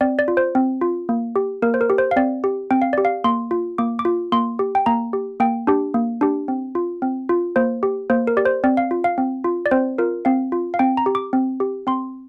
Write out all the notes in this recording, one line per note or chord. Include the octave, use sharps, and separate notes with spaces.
C4 D5
D5
F4
C5
C4
F4
A#3
G4
A#3 A#4
C5
A#4
G4
C5
F5
C4 D5
G4
C4 G5
F5
G4 D5
F5
A#3 C6
F4
A#3 D6
D6
F4
A#3 C6
G4
G5
A#3 A#5
G4
A#3 G5
D4 G4
A#3
D4 G4
C4
F4
C4
F4
A#3 C5
G4
A#3 C5
A#4
G4 D5
C5
C4 D5
F5
F4
F5
C4
F4
D5
C4 C5
F4 A#4
C4 F5
F4
F5
C4 G5
A#5
G4
D6
C4
G4
C4 C6